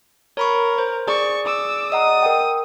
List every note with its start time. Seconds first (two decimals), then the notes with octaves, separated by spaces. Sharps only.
0.37 A#4 C#5 B5 C#6
0.78 C5
1.07 G#4 D5 C#6
1.45 D6 E6
1.92 D#5 F#5 A#5 D#6
2.23 A#4 G5